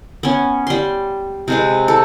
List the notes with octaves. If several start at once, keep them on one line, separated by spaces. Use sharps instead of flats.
B3 C#4
G3 C6
C3 G#3 B4
A4